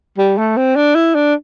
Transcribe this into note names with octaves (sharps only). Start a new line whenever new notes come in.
G3
A3
C4
D4
E4
D4